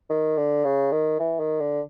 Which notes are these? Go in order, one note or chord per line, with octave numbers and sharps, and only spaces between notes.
D#3
D3
C#3
D#3
E3
D#3
D3